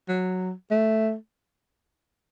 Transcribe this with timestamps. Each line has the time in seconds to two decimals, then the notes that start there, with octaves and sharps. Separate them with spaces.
0.09 F#3
0.71 A3